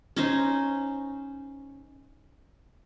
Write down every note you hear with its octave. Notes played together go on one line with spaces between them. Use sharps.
C#4 D#4 C5